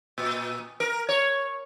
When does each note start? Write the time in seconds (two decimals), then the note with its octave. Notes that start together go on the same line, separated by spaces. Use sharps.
0.18 A#2
0.80 A#4
1.09 C#5